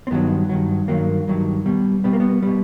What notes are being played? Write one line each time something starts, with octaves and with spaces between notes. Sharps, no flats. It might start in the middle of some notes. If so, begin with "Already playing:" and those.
C4
G2 D#3 F#3 B3
G2 D#3 F#3
G2 D#3 F#3 A#3
G2 D#3 F#3
B2 G3
B2 G3 B3
A#3
B3
B2 G3